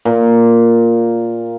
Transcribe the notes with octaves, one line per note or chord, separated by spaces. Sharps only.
A#2